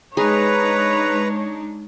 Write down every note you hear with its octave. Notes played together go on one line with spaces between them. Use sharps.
G#3 D4 D#4 G#4 B4 C#5 A#5